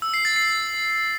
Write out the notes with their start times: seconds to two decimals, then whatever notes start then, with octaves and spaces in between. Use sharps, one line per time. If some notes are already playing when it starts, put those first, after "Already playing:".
0.02 E6
0.14 C7
0.25 A6
0.36 C7